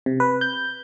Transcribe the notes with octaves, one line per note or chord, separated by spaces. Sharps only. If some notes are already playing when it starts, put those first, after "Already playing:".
C3
B4
G6